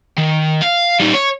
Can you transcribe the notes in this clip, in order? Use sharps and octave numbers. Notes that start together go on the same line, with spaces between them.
D#3
F5
G3 D#4
C#5